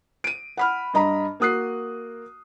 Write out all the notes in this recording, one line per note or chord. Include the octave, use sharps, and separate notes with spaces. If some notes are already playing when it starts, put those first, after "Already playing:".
D7 D#7
F#5 B5 F6
G2 D#5 A#5 B5
A#3 F#4 D#6 F#6 C7